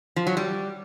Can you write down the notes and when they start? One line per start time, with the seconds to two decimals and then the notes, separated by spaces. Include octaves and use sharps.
0.16 F3
0.27 F#3
0.37 G3